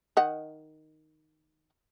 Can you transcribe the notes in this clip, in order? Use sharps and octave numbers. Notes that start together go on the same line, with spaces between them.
D#3 D#5 F#5